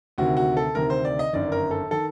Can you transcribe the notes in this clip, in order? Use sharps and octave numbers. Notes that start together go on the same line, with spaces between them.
D2 C3 D#3 F#4
F#4
A4
D2 C3 D#3 A#4
C5
D5
D#5
G1 F#2 D#3 D5
A#4
A4
D#3 A4